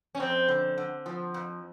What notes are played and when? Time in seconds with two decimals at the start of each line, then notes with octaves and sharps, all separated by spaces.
0.15 C#4
0.20 F2 C4
0.48 D3
0.78 D3
1.06 F3
1.34 F2